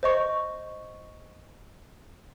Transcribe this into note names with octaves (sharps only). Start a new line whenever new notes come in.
C5 D#5 C#6